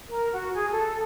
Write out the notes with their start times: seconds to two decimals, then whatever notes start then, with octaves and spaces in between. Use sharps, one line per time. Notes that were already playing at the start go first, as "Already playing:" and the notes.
0.08 A#4
0.32 F#4
0.54 G#4
0.70 A4